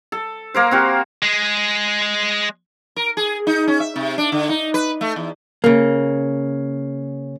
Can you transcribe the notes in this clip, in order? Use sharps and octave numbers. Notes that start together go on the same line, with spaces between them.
A4
A#3 A#4 C5
C4 F#4 G4
G#3 G#4
A#4
G#4
D#4
C#4
E5
C3
D4
D3
D#4
B4
A3
E2
C#3 A#3